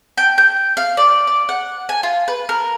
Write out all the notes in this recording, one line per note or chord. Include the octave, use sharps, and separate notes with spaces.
G5
G6
F5
D5
D5
F#5
G#5
F4
B4
A#4